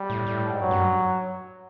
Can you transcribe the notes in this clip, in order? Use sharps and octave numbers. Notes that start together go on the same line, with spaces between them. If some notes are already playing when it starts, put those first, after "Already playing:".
Already playing: G3
A2
A2
G#2
G2 F#3
F#2
G2